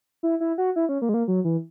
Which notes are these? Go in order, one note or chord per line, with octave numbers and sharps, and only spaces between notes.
E4
E4
F#4
E4
C#4
A#3
G#3
A#3
F#3
E3